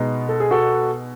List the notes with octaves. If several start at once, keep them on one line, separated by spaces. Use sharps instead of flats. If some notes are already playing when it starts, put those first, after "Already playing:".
Already playing: B2 G#3 B3 D#4
A4
G#4
F#4 A4